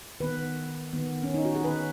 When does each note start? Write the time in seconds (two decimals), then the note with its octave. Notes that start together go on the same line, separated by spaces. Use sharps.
0.20 D#3 B3 B4
0.93 D#3 B3
1.23 C#4
1.34 D#4
1.45 F#4
1.55 G#4
1.65 D#3 B3 B4